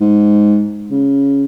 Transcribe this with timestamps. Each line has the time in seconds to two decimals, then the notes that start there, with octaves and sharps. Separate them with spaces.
0.01 G#2
0.91 C#3